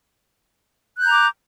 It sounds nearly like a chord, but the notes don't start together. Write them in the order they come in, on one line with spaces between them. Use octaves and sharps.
F#6 G6 A#5 D6